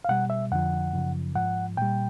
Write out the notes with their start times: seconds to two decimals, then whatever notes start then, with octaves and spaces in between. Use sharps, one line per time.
0.05 F5
0.09 B2 G3 F#5
0.30 E5
0.51 F2 D3 F3 F#5
0.93 F#2 C#3 F3
1.35 G#2 F3 F#5
1.77 A#2 G3 G5